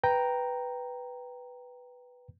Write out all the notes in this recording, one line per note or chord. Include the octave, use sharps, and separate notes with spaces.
B4 G5 A#5